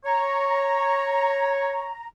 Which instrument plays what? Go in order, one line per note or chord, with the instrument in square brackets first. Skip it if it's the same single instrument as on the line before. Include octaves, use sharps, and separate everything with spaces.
[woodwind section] C#5 [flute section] A#5